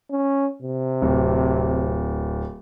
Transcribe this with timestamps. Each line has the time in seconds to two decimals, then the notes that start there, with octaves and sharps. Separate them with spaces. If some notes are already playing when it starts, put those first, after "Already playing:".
0.11 C#4
0.62 C3
1.02 D1